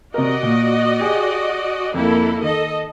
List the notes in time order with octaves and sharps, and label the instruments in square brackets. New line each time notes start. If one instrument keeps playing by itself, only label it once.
[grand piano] C3 A#4 [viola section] F#4 D5 D#5
[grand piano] A#2
G4 G#4
[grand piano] F2 [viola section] A#3 E4 A4
[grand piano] D#3 [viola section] A4 D#5